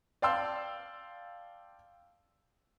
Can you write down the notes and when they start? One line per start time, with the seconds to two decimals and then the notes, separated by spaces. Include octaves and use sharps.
0.22 D5 F5 G5 A5 C6 E6